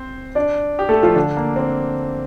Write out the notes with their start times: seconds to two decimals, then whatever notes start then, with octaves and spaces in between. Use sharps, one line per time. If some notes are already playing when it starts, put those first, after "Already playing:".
Already playing: C4 C5
0.35 D4 D5
0.79 G4
0.89 A3 A4
1.03 F3 F4
1.16 D3 D4
1.37 A#3
1.56 C4